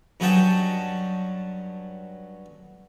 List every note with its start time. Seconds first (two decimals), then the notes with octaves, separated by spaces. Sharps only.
0.20 G2 F#3 C#4 D#5 G5 A5